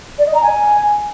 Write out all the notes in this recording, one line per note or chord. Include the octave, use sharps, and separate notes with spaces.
D5
D#5
A#5
G#5